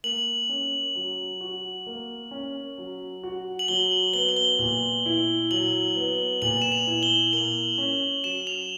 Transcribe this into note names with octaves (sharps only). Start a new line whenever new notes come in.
A#3 F#7
C#4
F#3
F#4
A#3
C#4
F#3
F#4
F#7
F#3 G7
F#7
B3 G7
F#7
G7
A#2
E4
F#3 F#7
B3
A#2 F#7
E7
F7
E4
G7
A#3 F#7
C#4
F#3 E7
F7